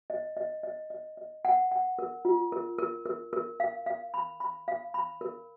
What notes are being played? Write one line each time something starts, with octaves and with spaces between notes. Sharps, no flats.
D#5
D#5
D#5
D#5
D#5
F#5
F#5
A#4
F4
A#4
A#4
A#4
A#4
F5
F5
B5
B5
F5
B5
A#4